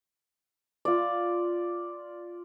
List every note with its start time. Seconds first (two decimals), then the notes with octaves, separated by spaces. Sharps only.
0.85 F4 D5